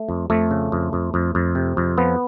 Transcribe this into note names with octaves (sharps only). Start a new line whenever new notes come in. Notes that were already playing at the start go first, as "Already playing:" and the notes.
Already playing: A3
F2
F2 A3
C#3
F2
F2
F2
F2
C3
F2
F3 B3